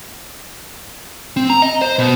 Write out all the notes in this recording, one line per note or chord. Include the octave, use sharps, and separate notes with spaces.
C4
A#5
D#5
C5
B2